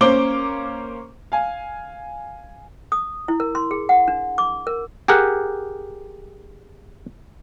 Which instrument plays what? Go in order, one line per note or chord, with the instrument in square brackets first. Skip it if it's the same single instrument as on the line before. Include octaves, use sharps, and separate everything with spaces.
[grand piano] A#3 C#4 C5 D6 G7
F5 G#5
[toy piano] D#6
E4
A#4
C6
G#4
F#5
D4
D6
A#4
[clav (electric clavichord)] G4 G#4 A#4 F#5